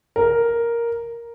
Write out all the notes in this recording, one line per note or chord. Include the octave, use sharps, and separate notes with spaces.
A#4